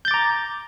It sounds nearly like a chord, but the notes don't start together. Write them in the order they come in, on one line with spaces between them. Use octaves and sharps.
G6 A6 D6 A#5